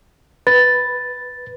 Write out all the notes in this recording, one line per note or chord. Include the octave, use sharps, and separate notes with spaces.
B4 A6